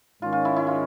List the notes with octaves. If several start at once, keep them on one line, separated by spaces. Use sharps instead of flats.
G#2 D#3 G#3 C#4 F4
F4
E4
E4
F4